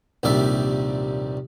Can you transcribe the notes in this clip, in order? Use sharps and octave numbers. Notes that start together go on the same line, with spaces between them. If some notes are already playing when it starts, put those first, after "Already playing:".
A#1 D#2 C3 G3 D5 E5